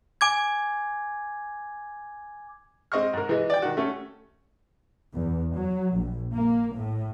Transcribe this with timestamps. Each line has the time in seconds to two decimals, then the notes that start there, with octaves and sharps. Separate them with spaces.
0.21 G#5 D6 G#6
2.92 G#3 C4 D#5 C#6 F6
3.13 G#2 A#4
3.29 E3 G#3
3.50 D5 G5
3.62 D#3 F#4
3.77 A3 C#4
5.14 E2
5.53 F#3
5.96 A#1
6.34 A#3
6.75 A2